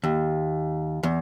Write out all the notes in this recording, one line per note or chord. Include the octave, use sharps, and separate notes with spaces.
D#2
E2